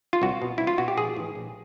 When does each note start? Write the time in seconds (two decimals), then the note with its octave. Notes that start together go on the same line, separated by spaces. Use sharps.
0.13 F4
0.22 C2 F#4
0.42 B2
0.58 C2 E4
0.67 F4
0.78 B2 F#4
0.88 G4
0.97 A#1 G#4
1.17 A2 E3
1.35 A#1